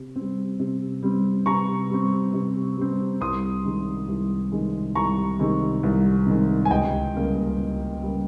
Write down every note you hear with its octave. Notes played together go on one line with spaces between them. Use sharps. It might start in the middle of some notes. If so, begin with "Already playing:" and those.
Already playing: C3
G3 C4
C3
G3 C4
C3 A#5 C#6
G3 C4
C3
G3 C4
C2 C6 D#6
C3 D#3 G#3
C2
C3 D#3 G#3
C2 A#5 C#6
C3 D#3 G#3
C2
C3 D#3 G#3
G#5
C#2 D#5 G5
C#3 G3 A#3
C#2
C#3 G3 A#3